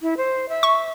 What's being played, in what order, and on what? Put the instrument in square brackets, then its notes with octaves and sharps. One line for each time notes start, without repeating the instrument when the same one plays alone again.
[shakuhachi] E4
C5
E5
[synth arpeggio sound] C#6